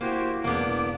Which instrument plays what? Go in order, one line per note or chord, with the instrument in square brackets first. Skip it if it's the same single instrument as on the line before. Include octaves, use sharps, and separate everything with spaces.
[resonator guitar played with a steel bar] A#3 [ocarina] E4 [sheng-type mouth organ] F#4 G4 C5
[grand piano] E1 [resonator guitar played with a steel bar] A#3 B3 [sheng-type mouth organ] D4 D6